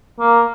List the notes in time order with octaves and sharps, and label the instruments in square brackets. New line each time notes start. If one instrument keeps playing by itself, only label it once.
[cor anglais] A#3